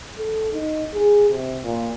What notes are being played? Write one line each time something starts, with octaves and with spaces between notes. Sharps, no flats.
A4
D#4
G#4
C3
A#2